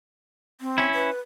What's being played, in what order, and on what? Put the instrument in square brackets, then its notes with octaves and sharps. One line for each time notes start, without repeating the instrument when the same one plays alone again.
[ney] C4
[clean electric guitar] C#4 E4
[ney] B4